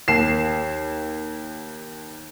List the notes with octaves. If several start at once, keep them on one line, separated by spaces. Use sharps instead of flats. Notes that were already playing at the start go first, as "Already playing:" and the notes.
D#2 C7 E7